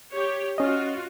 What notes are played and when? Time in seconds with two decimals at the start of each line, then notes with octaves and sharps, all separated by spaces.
0.13 G4 C#5
0.58 C#4 F4 F#4 D#5